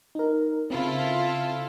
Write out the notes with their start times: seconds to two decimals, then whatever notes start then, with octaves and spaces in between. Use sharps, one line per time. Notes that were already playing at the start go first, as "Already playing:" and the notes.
0.15 D#4 A#4
0.70 C#3 C4 E4 F4 A4